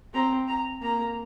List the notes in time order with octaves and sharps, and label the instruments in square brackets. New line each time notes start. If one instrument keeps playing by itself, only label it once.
[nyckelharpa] C4 [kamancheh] A#5
[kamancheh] A#5
[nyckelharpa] A#3 [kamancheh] A#5